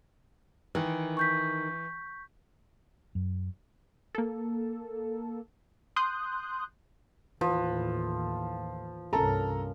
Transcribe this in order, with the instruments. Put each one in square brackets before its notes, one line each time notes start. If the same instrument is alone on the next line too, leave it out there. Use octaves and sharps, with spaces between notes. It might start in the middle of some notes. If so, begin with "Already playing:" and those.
[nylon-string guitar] D#3 [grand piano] E3
[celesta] C#6 G6 B6
[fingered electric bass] F#2
[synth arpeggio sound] A#3 A4
C6 D#6 F#6 G6
[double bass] D#2 A2 [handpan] E3 B4 [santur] F3
[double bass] C2 G2 [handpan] C#4 A#4 [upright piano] A4 A#5